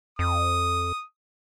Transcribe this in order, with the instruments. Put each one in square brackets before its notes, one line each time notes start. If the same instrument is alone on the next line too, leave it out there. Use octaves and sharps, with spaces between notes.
[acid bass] F2 [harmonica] D#6